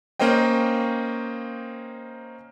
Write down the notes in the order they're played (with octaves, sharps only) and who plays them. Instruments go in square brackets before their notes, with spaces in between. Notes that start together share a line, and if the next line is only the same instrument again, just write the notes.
[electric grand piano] A#3 C#4 C5 D#5 G5